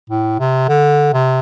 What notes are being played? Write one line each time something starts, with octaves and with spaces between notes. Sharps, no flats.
A2
C3
D3
C3